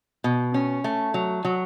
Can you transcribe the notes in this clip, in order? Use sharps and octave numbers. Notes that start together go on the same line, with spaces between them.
B2
C#4
A3
F#3
F#3